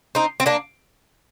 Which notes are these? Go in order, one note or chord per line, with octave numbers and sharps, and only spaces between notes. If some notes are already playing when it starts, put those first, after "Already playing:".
C4 D#4
C4
A#3 D4